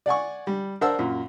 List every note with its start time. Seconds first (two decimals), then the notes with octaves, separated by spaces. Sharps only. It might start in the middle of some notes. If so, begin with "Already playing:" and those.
0.06 D5 F#5 G#5 C#6
0.47 G3
0.81 D4 A#4 C5 F#5 A5 E6
0.99 F#2 A#2